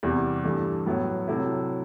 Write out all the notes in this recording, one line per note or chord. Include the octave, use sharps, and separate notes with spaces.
E2 C3 E3 G3
G2 E3 A3
A2 F#3 B3 E4
C3 F#3 A3 E4